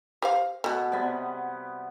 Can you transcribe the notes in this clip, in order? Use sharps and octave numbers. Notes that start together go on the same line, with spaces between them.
G4 C5 F5
B2 A3 F#4
C3 G3 B3